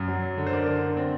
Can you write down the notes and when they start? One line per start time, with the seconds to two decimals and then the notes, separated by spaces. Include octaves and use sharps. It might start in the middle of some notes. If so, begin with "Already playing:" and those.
Already playing: F#2
0.08 F#3
0.37 D3
0.47 C5
0.53 A#4 D5
0.67 D3
0.97 C4